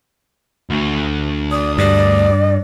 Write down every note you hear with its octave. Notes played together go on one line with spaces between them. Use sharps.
D2
D5 D#6
G2 D5